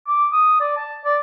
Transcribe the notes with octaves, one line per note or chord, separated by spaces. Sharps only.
D6
D#6
D5
A5
D5